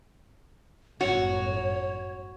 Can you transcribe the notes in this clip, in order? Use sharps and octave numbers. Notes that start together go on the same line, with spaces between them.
G1 F#2 A2 F#4 C#5